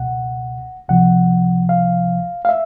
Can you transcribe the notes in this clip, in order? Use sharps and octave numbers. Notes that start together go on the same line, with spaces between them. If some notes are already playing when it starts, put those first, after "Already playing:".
Already playing: C#2 B2 F#5
C#2 C3 F3 F#5
F5
F5
E5